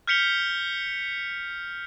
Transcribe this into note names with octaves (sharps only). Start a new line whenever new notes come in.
F6 G6 B6 C#7 F7 G7